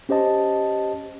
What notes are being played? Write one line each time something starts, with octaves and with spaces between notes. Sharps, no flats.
C#4 G4 C5 D#5 A5